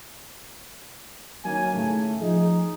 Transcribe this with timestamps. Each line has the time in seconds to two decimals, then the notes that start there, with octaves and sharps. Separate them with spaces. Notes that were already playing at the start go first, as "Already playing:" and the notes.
1.45 D#3 F#3 A#3 C#4 D#4 G#5
1.75 A2 C#3 A3
2.21 F3 D#4 G#4